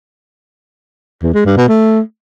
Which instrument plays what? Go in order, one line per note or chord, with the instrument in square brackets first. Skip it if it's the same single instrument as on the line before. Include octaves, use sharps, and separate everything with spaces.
[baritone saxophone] E2
G#3
G2
B2
A3